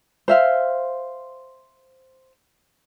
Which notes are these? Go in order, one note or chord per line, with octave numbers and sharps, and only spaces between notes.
C5 E5 F5